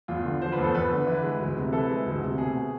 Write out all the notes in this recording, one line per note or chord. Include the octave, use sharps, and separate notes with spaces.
E2 F4
D3
F3 C5
B4
E2
A4
E2 B4
D3
E3
G#3
D2
C3
E3 A4
G#3
D2
C3
B2 G#4